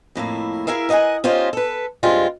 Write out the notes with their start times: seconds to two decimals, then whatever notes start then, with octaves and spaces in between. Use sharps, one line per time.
0.15 F2 A2 A#3 E4
0.67 E4 G#4 A#4 E5 F5
0.89 A#4 D#5 F5 F#5 G#5
1.24 C#4 D#4 F4 G4 C5 D#5
1.53 A4 B4
2.03 G2 G3 G#3 C4 F4